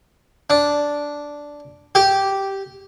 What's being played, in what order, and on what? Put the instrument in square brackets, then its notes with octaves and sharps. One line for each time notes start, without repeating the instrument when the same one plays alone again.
[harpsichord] D4
G4